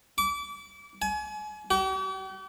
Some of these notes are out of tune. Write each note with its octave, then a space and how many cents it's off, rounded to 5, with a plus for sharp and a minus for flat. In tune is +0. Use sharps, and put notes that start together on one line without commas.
D6 -30
G#5 +35
G4 -45